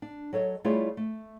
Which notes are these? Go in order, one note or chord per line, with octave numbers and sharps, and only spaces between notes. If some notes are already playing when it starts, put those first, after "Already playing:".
D4
F#3 A4 C#5 D#5
G3 A3 E4 F4 G#4 C#5
A3